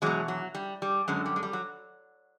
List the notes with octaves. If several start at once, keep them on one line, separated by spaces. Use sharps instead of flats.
E2 B2 F#3 G#3
F#3
G3
G3
F#2 D3 F#3 G#3
G3
G#3
G3
F#3